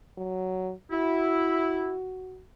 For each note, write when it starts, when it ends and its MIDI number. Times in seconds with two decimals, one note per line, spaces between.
0.18 0.72 54
0.91 1.92 64
0.91 2.41 66